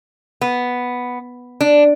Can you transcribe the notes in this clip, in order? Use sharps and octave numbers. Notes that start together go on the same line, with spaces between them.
B3
D4